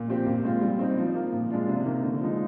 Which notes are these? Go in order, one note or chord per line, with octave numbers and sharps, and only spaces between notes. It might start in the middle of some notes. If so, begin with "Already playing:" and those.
Already playing: A#2
F3 C4 G4
A#2
G#3 C4 F4
G3
C4 D#4
F3
A#3 F4
A#2
G#3 D4 F4
C3
D#3 A#3
D3
F3 G#3 D#4